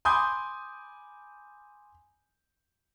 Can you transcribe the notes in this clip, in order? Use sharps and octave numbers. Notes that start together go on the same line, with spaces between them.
G#5 B5 C6 D6 D#6 G6